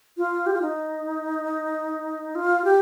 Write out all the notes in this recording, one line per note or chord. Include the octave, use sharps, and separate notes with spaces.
F4
G4
F4
D#4
F4
G4